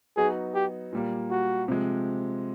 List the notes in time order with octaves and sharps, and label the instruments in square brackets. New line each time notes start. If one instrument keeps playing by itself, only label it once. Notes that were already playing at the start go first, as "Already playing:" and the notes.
[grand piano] F#3 B3 D#4 F#4 [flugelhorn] G#4
[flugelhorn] G4
[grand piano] A#2 G3 A#3
[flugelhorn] F#4
[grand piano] C3 F3 G#3